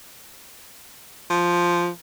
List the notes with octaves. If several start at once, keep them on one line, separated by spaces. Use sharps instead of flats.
F3